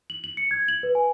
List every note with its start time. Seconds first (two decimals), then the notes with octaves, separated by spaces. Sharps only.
0.10 F#7
0.24 F#7
0.37 C#7
0.51 G#6
0.68 F#7
0.83 B4
0.95 G#5